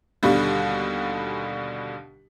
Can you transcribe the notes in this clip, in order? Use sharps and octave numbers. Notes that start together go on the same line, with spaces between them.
D#2 B2 D3 G3